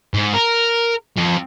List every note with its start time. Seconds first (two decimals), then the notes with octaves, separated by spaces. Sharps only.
0.14 G#2
0.34 A#4
1.17 F2